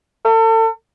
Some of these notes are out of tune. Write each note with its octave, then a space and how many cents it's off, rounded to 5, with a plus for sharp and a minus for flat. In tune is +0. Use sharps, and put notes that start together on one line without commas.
A4 +35